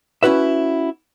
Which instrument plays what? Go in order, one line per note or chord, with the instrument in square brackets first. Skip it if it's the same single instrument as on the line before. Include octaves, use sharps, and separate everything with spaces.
[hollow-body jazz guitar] C#4 E4 F#4 B4 E5